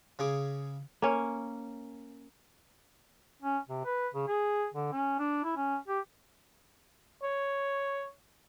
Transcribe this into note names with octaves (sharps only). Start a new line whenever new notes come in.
C#3 G#4 D6
A#3 C#4
C#4
C3
B4
C#3
G#4
D3
C#4
D4
E4
C#4
G4
C#5